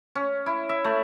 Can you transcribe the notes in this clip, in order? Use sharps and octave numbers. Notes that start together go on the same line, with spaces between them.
C#4
E4
E5
A3